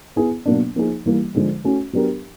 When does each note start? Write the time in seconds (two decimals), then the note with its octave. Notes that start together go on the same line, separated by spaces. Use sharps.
0.16 B3 E4 G#4
0.46 B2 F#3 A#3 D4
0.76 F3 A#3 D#4 G#4
1.06 E3 G3 A#3
1.35 D3 F3 G#3
1.64 A3 C#4 F#4
1.93 F#3 B3 D4 G4 A#4